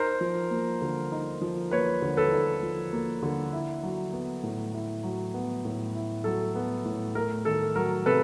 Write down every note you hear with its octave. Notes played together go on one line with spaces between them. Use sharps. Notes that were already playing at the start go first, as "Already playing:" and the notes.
Already playing: D#4 A#4 C5
F3
A#3
D3
D#4
F3
A#3 B4 C#5
D3
A4 B4
D#4
F3
A#3
D3
E4
F#3
B3
A2
E4
F#3
B3
A2
E4
F#3 A4
B3
A2
A3 A#4
D#3 A4
F#3 A#4
C3 A4 B4